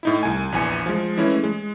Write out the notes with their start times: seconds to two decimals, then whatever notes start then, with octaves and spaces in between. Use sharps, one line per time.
0.03 A2 D#4 E4
0.23 C2 G#5
0.52 A#1 E2 G#5 C#7
0.86 F3 G#3
1.17 E3 G#3 A3 C#4 E4
1.44 G#3